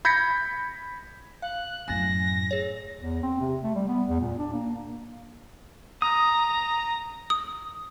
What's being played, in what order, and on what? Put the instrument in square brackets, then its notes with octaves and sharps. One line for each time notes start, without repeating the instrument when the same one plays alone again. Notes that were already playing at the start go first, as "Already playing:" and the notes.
[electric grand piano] B5 G6 G#6 A#6 B6 C#7
[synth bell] F5 [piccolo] F#6
[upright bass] F#2 A2 [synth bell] G#5 A6 [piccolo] A#6
[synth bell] G#4 C#5
[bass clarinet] E2
C4
C3
A3
G3
B3
E2
A#2
D4
A#3
[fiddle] A#5 [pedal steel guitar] D#6
[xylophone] D#6